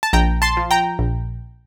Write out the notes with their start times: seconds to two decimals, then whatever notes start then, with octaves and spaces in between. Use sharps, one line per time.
0.03 A5
0.13 A#1 G5 A#5
0.42 A5 C6
0.57 F3
0.71 G5 A#5
0.99 A#1